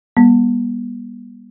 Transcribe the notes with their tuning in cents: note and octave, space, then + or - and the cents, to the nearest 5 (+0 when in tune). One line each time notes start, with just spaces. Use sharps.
G3 +20 B3 -40